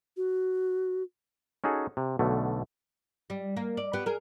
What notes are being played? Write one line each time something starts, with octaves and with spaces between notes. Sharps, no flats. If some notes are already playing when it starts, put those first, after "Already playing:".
F#4
C#4 D#4 F#4 G#4 A4
C3
B1 B2 D3 A3
G3
A#3
D5
B3 G4
G#4 A#4